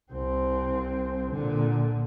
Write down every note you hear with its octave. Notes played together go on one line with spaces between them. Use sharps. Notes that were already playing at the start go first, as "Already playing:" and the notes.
C2 C4
A#2 D3